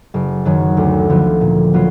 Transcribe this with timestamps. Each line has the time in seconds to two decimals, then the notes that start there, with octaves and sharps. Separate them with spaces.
0.14 F#1
0.45 F#2 D#3 F#3
0.77 D2
1.10 D3 F3 B3
1.41 A#2
1.74 F#3 B3 F4